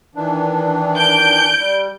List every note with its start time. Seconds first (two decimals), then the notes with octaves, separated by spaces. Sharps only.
0.15 D#3 E3 D4
0.96 G6 D7
1.59 G3